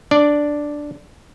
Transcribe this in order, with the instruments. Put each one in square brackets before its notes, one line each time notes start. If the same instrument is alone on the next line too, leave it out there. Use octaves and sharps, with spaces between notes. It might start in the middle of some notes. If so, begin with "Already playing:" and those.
[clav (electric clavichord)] D4 D5